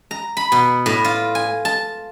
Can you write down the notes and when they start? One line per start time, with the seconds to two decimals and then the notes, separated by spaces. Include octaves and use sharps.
0.11 A#5
0.37 B5
0.52 B2
0.86 A2
1.05 F4
1.35 G#5
1.65 A5